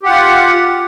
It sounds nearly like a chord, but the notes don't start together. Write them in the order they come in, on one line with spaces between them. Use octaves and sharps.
G4 F#5 F4